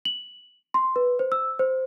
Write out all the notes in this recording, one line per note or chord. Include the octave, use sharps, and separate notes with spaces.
F#7
C6
B4
C5
E6
C5